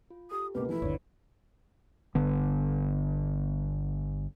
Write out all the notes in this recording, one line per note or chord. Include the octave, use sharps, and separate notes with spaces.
F4
G4 A4 D#6
C#2 B2 A#3 G4 B4
E3 F3 A3 E4
G1 D#2 D3 C#5
G1 D3 B3